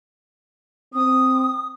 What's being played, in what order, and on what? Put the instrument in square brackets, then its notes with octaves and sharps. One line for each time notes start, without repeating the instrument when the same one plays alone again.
[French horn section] C4 [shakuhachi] D#6